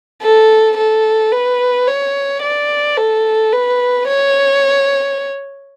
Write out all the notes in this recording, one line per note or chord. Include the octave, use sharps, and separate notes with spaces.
A4
A4
B4
C#5
D5
A4
B4
C#5